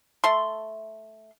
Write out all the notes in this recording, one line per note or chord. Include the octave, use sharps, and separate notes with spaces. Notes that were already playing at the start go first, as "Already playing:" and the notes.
A3 C6